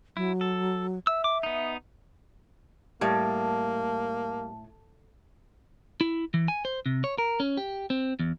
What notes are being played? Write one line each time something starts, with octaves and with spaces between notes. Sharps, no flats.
F#3 E4
A4
E5 E6
D6
B3 D#4
A2 G3 A#3 A5
E4
E3
G#5
C5
C3
C#5
A#4
C#4
G4
C4
E2